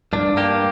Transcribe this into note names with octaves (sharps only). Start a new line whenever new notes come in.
G2 D4
A#3 G4